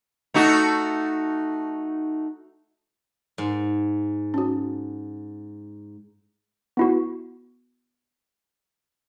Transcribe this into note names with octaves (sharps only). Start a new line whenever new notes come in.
A3 D#4 F#4
G#2
C#4 F#4
B3 E4 F#4